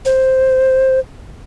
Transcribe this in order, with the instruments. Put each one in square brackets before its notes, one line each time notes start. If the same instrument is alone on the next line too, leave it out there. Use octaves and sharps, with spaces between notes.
[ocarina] C5